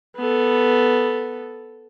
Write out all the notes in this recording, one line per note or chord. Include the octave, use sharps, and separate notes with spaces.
B3 A4